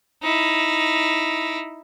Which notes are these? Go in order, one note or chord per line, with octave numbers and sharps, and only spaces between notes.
D#4 E4